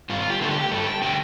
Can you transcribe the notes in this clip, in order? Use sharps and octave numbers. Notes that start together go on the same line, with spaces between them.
G2 F4
G4
D3 A3 A4
G4
G2 A4
G5
D3 A3 G5